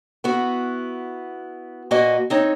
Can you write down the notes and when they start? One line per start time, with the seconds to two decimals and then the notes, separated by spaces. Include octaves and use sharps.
0.24 B3 E4 F#4
1.91 A#2 A#3 F#4 B4 D#5 G#5
2.30 C4 D#4 C#5